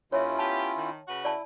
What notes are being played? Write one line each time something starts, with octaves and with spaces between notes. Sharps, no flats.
D#2 C#4 E4 F4 C#5 E5
B3 G4 A5
D#3
C#3 F#4 B4
E4 D5 A5